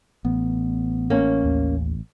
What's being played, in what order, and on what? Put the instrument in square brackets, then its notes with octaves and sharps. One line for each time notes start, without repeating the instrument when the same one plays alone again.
[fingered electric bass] A1 [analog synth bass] B3
[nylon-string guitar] A#3 C#4
[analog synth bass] D#2